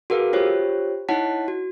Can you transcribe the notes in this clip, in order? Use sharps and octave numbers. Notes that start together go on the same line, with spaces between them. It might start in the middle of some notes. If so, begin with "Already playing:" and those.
F#4 G#4 A#4 B4 F5
F4 G4 C5 C#5
D#4 E4 C#5 F#5 A5 B6
F#4